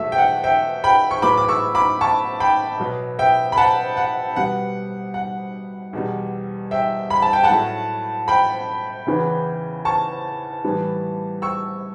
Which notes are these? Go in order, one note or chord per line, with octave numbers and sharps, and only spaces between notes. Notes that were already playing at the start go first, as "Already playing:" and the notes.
Already playing: E2 B2 F#3 A3 E5
G5
F#5
E5 G5
G5 B5
C#6
A2 F#3 B3 B5 D6
D6
C#6 E6
B5 D6
A5 C#6
G5 B5
B2 F#3 B3
E5 G5
B5
F#5 A5
F#5
B2 G3 B3 F#5
F#5
E2 B2 G3
E5 G5
B5
A5
G5
F#5 A5
A2 F#3 A3
G5 B5
E2 C#3 E3 B3
A5 C#6
A2 E3 G3 B3
C#6 E6